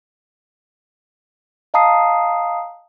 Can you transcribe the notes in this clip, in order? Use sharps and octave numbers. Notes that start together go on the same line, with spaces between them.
D#5 F5 A5 A#5 D#6 C7